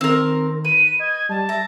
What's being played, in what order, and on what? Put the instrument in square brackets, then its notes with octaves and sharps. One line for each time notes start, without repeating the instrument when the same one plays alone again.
[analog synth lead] D#3 [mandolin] C4 A#4
[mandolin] B4 [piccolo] D#7
[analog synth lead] D#5 [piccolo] G#6
[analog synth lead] G3 [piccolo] A5
[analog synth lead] E5 [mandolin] A#5